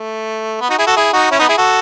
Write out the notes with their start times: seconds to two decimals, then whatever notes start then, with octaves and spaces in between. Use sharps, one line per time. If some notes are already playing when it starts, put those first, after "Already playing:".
Already playing: A3
0.61 B3
0.70 D#4 F#4
0.78 E4 G#4
0.87 F#4 A4
0.97 E4 G#4
1.13 D#4 F#4
1.31 C#4 E4
1.39 B3 D#4
1.49 E4 G#4
1.58 F#4 A4